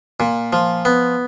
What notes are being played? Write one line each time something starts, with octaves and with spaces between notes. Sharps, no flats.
A#2
F3
B3